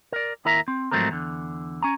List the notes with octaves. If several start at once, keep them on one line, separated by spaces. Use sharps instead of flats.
A#4 D5
D#2 E4 A#4 E5 A#5
C4
G#2 F3 F#3 A3 C4 A#4
E2 D3
C#4 G#5 A#5